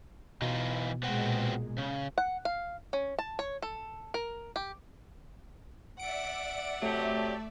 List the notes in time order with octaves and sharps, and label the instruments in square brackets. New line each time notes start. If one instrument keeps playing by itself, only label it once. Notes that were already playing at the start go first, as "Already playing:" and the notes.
[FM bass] B2 [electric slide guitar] E3 D#4 F4
[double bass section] A#2 G#3 [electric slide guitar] B3 C4 F#4
[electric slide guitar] C#3
[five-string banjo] F#5
F5
C#4
A5
C#5
A4
A#4
G4
[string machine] D5 E5 [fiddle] F#5 [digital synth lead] D7
[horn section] C3 F#3 G4 [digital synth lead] A3